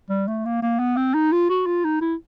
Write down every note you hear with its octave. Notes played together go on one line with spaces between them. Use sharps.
G3
A3
A#3
A#3
B3
C4
D#4
F4
F#4
F4
D#4
E4